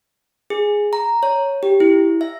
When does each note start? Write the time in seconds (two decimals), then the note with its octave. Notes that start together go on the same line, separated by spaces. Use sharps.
0.50 G#4
0.93 A#5
1.23 C#5
1.63 G4
1.80 E4
2.21 E5